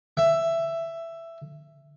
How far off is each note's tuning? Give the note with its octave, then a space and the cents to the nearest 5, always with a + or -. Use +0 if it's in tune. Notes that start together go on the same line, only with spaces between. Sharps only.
E5 +10